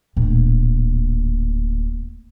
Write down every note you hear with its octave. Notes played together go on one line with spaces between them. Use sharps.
D1 A#2